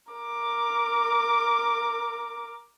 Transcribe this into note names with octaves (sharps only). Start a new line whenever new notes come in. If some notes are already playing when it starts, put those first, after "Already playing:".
A#4 D6